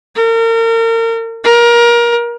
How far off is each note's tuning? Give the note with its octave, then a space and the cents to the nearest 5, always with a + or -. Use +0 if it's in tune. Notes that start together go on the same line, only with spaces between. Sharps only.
A#4 -35
A#4 +25